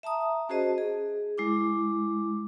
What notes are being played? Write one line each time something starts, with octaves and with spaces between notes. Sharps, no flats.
E5 A5 A#5 D#6
C#4 F#4 G#4 C5 D#5 A5
G#4
G#3 E4 D6